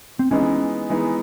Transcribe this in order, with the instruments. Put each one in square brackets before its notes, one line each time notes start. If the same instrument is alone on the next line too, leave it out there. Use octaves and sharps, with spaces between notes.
[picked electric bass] C4
[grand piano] E3 G#3 B3 D#4 [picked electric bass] C#4
[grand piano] E3 G#3 B3 D#4